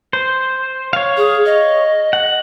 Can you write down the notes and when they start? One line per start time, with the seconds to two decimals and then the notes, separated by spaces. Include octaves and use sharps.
0.13 C5
0.93 C#5 F5
1.17 G#4
1.46 D#5
2.13 F#5